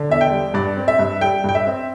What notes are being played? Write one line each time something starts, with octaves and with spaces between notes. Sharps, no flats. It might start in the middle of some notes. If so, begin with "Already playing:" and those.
Already playing: D3
E2 E5
G5
G3
G2 D5
C4
E5
G2
G3 G5
G2 G5
E5
C4